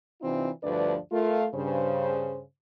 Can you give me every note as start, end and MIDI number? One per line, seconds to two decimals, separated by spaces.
0.22 0.49 48
0.22 0.49 52
0.22 0.49 60
0.22 0.49 62
0.22 0.49 63
0.22 0.49 65
0.64 0.96 38
0.64 0.96 43
0.64 0.96 53
0.64 0.96 62
0.64 0.96 71
0.64 0.96 74
1.12 1.46 57
1.12 1.46 65
1.12 1.46 70
1.55 2.42 43
1.55 2.42 49
1.55 2.42 72